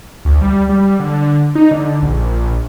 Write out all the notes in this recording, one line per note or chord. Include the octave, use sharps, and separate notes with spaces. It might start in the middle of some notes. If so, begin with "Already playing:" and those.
D2
G3
G3
D3
D#4
D3
A#1